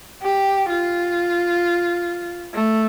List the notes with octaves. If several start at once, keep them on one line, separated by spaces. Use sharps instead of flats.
G4
F4
A3